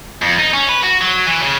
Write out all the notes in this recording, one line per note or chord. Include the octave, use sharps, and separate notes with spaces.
F2
D#4
C#4
B4
F#4
F#3
E3
C#3